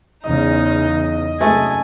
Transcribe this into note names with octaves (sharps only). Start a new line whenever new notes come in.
E2 C#3 D#4 D#5
C2 F#2 G#3 A3 G#5